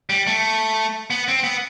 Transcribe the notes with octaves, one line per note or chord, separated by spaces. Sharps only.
G3
A3
B3
C4
B3